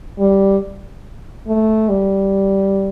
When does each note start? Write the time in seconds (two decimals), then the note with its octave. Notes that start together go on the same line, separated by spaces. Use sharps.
0.19 G3
1.47 A3
1.89 G3